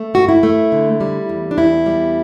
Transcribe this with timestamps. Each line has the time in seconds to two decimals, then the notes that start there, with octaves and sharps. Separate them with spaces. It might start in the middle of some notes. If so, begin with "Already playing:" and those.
Already playing: A3
0.14 G2 F#4
0.29 E4
0.43 A3
0.72 D3
1.01 G3
1.29 E2
1.51 D4
1.57 E2 E4
1.86 G3